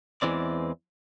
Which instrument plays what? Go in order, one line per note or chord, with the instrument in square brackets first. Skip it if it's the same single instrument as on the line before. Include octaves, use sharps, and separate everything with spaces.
[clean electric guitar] E2 A#2 E3 G#3 C4 D5